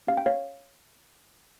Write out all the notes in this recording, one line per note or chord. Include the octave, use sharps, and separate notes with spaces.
C#4 G4 F5
G5
C#5 F5